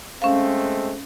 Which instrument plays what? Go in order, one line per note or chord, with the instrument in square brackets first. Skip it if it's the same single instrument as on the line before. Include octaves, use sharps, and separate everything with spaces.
[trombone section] G#3 A3 C4 [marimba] C#4 F5